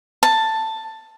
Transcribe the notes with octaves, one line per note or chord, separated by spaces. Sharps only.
A5